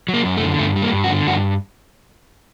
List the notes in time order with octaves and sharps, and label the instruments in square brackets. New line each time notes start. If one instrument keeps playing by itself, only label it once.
[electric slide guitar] F#3
A#3
F#2
A3
D3
G2 A3
G3
A#3
G2
F#4
D3
G2 F#4